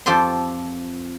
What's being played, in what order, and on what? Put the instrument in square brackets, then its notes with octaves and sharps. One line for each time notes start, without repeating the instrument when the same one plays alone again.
[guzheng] F2 F4 G4 A4 C5 C6